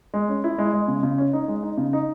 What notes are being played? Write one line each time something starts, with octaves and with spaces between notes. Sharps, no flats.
G#3
C#4
E4
G#3
G#3
C#3
C#3
C#4
D#4
G#3
D#4
C#3
D#4